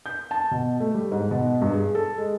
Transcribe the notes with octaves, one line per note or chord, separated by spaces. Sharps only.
G6
A5
B2
A3
G3
G#2
B2
G2
G#4
A4
G#3